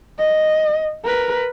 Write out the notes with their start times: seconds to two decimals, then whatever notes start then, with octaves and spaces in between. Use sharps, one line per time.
0.19 D#5
1.05 A#4 B4